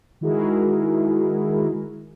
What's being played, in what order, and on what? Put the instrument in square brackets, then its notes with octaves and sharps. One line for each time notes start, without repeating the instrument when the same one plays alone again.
[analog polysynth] D#3 G#3 E4 F#4 G#4 A#4